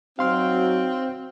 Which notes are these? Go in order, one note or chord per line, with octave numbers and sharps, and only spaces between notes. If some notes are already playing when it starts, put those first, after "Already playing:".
F#3 C4 D#4 F#4 F5 C6 F6